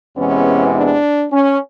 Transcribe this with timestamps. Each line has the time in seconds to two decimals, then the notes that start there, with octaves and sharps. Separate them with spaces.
0.16 E2 C3 E3 G#3 B3 C#4
0.75 D4
1.31 C#4